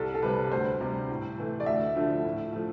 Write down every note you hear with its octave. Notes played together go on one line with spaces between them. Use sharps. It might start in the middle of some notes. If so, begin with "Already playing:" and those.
Already playing: C2 A4
A4
C3 G3 B4
D2 C5
C3 G3
A2
E3 A3
D5
D2 E5
D3 F3 A3
A2
F3 A3